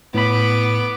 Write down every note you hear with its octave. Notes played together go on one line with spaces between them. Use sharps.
A2 B3 B5 D6